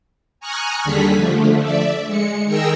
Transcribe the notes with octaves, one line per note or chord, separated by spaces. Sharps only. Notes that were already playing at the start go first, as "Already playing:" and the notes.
G#5 A#5 C#6 D#6 F6 F#6
D#2 D3 G3 G#4 A4 B6
D3 F3 A3
D5 E5
G#3 C#7
D#3 G#4 A#4 G5 E6 A#6